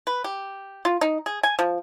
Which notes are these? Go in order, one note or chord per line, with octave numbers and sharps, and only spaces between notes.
B4
G4
F4
D#4
G#4
G#5
F3